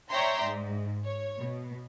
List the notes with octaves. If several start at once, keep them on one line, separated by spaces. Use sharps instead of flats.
C#5 D5 E5 G5 A#5 C6
G#2
C#5
B2